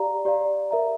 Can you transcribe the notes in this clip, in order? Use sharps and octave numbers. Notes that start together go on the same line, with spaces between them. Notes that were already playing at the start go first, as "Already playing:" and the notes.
Already playing: G4 D5 F5 A#5
G4 D5 F5 A#5
A#4 E5 A#5